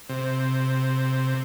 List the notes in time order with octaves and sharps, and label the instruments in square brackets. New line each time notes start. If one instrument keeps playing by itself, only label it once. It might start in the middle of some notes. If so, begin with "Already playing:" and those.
[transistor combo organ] C3